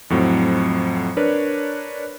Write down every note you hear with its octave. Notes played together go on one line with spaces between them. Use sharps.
F2 A2 F#3 C4
D4 A#4 B4 C#5 D5